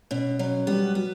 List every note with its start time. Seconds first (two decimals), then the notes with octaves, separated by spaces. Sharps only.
0.11 B2 C#4
0.39 F#3 C#4
0.67 G3 B3
0.95 F#3 B3